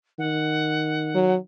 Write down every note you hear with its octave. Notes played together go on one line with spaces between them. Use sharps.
D#3 F#5
F#3